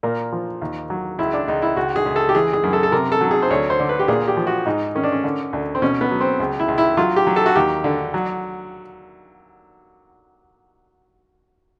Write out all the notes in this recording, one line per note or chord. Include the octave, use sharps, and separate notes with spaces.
A#2 A#4
F3
D#2
F#3
C#2 E4
D4
C#2 D#4
E4
C#2 F#4
G#4
C#2
A4
G4
E3 G#4
G#4
F#2
A4
A4
C3 A#4
A4
F#3
G#4
C5
D2 C#5
C5
D3
B4
G4
A#2 G#4
G4
F3
F#4
G#2 D#4
D#3 C#4
D4
C#4
D3
D2
C4
B2 C#4
B3
F#3
C4
C#2
E4
C#2
E4
F#3 F4
G4
F#3
A4
F#4
D#2 G4
D3
F#3